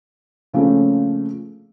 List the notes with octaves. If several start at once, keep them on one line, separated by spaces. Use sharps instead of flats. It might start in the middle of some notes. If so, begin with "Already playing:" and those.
C#3 F3 A3 A#3 C4 C#4